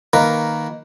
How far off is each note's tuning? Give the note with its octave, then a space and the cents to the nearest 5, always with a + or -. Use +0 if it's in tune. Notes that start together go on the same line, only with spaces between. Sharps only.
D#3 +0 A#3 +0 B4 +0